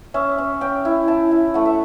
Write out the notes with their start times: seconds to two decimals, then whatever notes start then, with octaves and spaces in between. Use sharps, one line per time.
0.14 C#4 E5
0.38 C#4
0.61 C#4 G5
0.85 E4
1.08 E4 A5
1.31 E4
1.54 A3 F#5
1.65 E5